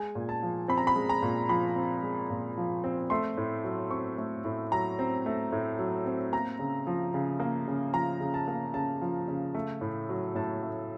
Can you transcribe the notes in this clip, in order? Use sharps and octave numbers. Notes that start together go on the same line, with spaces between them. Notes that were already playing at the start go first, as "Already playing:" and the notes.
Already playing: G#3 G#5
A#2
A5
F3
C4 B5
A#5
B5
G#3
A#5
A#2
F3 B5
C4
G#3
A#2
F3
C4
A3 C6
A2
F#3
C4 C#6
A3
A2
F#3 A#5
C4
A3
A2
F#3
C4
A#3 A#5
C#3
F3
C#3
A#3
C#3
F3 A#5
C#3
A5
A#3
C#3 A5
F3
C#3
A3
A2
F#3
A2 A5
A3